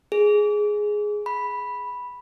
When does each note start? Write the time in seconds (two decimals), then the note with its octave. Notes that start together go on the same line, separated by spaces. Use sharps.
0.12 G#4
1.26 B5